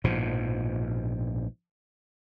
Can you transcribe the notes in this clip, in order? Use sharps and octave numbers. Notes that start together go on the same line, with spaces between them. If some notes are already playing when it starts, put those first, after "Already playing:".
A#1 G#2 B2 F3